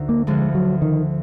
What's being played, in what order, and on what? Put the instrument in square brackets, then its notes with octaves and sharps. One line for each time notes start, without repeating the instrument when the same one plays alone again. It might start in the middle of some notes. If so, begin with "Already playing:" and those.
Already playing: [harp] D2 D3 D#4 F#4
[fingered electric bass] A#3
[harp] D2 D3 F3 B3 [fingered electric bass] G#3
[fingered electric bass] F#3
D#3